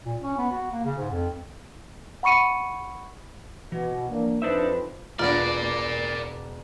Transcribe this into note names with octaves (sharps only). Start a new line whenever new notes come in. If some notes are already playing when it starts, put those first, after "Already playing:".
A#2
C#4
B3
F#4
A#3
C#3
G#2
F2
F#5 B5 C#6 C#7 D#7
B2 E3 F#4
A#3 D4
F2 D4 D#4 B4 C5 E5
E1 A#3 B3 D4 F4 A#4 D5